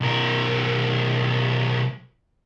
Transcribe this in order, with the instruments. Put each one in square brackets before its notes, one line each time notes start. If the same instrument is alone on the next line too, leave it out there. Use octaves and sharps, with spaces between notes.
[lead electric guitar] B1 A#4